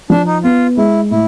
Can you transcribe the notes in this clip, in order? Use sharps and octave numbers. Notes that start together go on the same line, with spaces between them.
F3 D4
D#4
B3 F4
G#3 E4
A2 E4